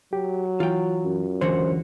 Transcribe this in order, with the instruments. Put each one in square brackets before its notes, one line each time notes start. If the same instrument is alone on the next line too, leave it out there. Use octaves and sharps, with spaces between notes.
[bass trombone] F#3 [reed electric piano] G4
[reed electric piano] E3 [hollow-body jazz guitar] F4 G5
[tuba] F#2
[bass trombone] C#2 [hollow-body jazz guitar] D3 E3 F#4 [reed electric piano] C5